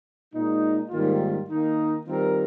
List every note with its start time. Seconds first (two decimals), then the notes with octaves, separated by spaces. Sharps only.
0.32 A#2 G#3 D#4
0.89 G#2 D#3 G3 A#3 F4
1.48 D#3 A#3 D#4
2.05 D#3 G3 C4 F4 A#4